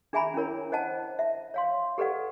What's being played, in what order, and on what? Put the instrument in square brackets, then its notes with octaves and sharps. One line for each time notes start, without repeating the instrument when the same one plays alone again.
[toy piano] D4 G#4 E5 G#5 A#5 B5
C#4 D4 E4 A#4 C#5
C5 D#5 F#5 A5
E5
C#5 F5 C6
G4 A4 B4 D5 F#5